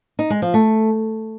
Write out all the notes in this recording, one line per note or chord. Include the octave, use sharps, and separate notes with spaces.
D#4
G#3
F3
A3